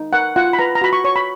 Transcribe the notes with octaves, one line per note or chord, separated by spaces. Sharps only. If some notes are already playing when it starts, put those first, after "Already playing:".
Already playing: D#4
A#4 F#5
F4 F#5
B5
B4 A#5
A#5
F#4 B5
C#6
C#5 C#6
B5